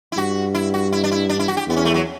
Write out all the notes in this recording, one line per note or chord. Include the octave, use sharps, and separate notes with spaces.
E4
G2 F#4
E4
F#4
E4
D4
E4
D4
E4
F#4
G4
E2 B3
C#4
A3
F#3